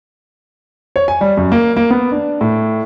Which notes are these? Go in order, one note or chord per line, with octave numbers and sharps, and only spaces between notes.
C#5
G#5
G3
F#2
A#3
A#3
B3
D4
A2